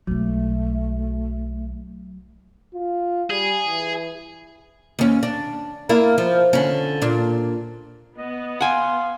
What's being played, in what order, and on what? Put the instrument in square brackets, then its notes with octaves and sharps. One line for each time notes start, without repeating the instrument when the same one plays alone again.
[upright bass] B1 G#3 [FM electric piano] F#3 [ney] A3
[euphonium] F4
[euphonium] G3 [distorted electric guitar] G#4
[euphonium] E3
[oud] D#2 C#4
D4
A#3 D4 E4
F3
D3 C#4
A#2 D4
[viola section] B3 [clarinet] D#5
[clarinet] F5 [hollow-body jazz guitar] F#5 G#5 [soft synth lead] C6